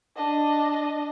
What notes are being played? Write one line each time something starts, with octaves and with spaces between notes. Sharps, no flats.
D4 D#5